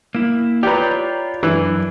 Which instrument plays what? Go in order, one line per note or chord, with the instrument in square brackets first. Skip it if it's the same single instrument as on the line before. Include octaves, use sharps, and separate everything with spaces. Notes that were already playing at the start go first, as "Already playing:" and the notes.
[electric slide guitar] A#3 E4
[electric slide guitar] F4 C#5 [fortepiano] G4 B4 [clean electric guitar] D5 A#5
[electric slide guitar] F#2 D4 [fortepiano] E3